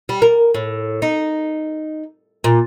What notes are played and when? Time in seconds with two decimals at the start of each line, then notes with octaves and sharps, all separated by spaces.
0.09 G3
0.22 A#4
0.54 A2
1.02 D#4
2.44 A#2